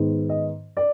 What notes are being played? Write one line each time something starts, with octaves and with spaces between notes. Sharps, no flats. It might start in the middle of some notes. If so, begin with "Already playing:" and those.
Already playing: G#2 D#3 B3
D#5
D5